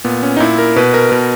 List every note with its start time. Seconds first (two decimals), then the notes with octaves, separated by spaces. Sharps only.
0.04 A#2 B3
0.23 C#4
0.37 D#4
0.40 A#2 E4
0.58 A#4
0.76 B2 B4
0.94 A#4
1.12 B2 A#4